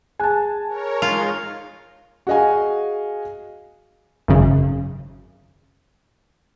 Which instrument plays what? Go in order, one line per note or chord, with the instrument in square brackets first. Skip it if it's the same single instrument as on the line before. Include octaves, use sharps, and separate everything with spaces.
[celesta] G#4 F#6 [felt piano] G#5 A5
[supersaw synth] A#4 C#5
[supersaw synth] G#3 D#4 [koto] F4
[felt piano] F#4 G#4 D#5 F5 G#5
[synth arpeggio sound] G#1 F#2 C#3